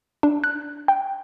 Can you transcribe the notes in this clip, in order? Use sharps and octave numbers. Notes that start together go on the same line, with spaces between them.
D4
F#6
G5